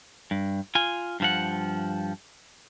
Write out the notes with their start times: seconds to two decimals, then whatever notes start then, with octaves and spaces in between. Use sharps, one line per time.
0.31 G2
0.75 F4 G#5
1.20 G2 F3 F#5